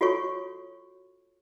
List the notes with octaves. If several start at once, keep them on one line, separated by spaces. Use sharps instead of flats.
F4 F#4 A4 C#5 C#6